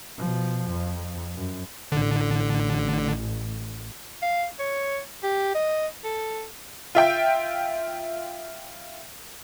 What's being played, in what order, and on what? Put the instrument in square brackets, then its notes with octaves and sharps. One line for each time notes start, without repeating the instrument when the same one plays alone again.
[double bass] B2 F3
F2
F#2
[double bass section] A1 [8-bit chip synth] D3
[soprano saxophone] F5
C#5
G4
D#5
A4
[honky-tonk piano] F4 E5 G5